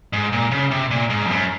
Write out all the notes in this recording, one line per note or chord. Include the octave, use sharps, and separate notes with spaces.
G#2
A#2
C#3
C3
A#2
G#2
F2
F#2